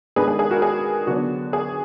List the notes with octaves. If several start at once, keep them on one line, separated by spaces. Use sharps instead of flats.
D#3 G#3 D4 G#4 B4
G#4
G#4
F#4 A#4
G#4
D3 F#3 B3 D4 F#4
G#4